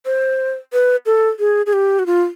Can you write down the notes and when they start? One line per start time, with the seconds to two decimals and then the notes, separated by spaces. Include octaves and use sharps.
0.06 C5
0.73 B4
1.06 A4
1.39 G#4
1.66 G#4
1.73 G4
1.99 F#4
2.06 F4